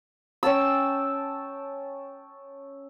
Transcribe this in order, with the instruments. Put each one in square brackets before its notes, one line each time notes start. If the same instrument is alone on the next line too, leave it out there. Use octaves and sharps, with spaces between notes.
[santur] C#4 G5 A5 E6